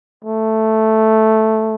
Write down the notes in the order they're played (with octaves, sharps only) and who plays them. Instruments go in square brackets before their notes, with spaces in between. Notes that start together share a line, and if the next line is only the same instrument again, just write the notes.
[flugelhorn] A3